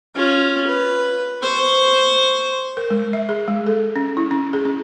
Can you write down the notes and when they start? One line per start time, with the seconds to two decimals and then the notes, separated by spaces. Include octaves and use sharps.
0.15 C#4 F4
0.67 B4
1.42 C5 C#6
2.77 A#4
2.90 G#3
3.13 E5
3.29 G#4
3.48 G#3
3.66 A4
3.96 C#4
4.17 E4
4.31 C#4
4.53 G#4
4.65 C#4